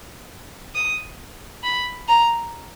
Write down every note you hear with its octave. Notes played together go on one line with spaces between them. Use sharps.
D#6
B5
A#5